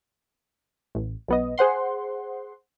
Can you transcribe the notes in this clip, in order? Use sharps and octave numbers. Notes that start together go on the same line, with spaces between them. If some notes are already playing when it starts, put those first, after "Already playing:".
A1
B1 B3 D#5
G#4 C5 F#5 C6